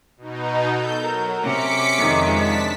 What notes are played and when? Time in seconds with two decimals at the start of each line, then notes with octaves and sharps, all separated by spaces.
0.18 B2 D#4
0.73 A4 G6
1.03 F#3 A#4
1.42 C3 C#4 D6 B6 C#7
1.98 F2 D#3 G#3
2.33 D4 A5 B6